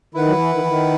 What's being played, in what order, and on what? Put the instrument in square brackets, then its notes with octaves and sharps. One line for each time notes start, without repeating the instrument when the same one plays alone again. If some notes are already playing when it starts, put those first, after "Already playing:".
[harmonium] D#3 [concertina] E4 B4 F#5
[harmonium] F#3
E3
D#3
E3
D#3